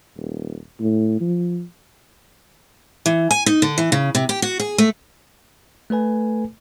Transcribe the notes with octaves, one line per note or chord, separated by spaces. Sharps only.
D#1
A2
F3
E3
G#5
D#4
D3
E3
C#3
C3
G4
F#4
G#4
A3
A3 A4 B4 G#5